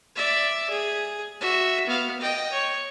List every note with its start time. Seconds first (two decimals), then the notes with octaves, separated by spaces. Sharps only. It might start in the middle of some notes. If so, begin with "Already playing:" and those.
0.15 D5 E5
0.70 G#4
1.40 F#4 E5
1.87 B3 F5
2.21 D#5 G5
2.52 C#5